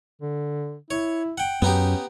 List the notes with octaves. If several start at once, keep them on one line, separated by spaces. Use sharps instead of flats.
D3
E4 C#5
F#5 G5
F#2 B3 C#4 D#4 G4